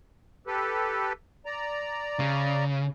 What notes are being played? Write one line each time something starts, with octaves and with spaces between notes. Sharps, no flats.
G4 A4 B4
D5 A#5
C#3